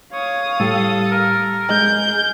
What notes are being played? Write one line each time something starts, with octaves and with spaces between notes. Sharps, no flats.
C#5 F5 D#6
A2 G3 G4 A4
A#4
G#3 G#4 D#5 G6